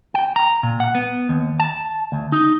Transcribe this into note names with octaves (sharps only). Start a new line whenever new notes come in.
G5
A#5
A#2
F#5
B3
D#2
A5
D2
D#4